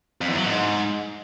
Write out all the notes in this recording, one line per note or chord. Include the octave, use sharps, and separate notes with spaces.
F2
E2
F#3
G#2